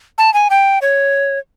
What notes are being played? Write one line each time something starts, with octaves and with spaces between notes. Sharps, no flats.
A5
G#5
G5
C#5